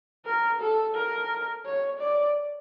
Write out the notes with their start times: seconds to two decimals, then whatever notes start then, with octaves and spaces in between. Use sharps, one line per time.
0.26 A#4
0.61 A4
0.96 A#4
1.66 C#5
2.00 D5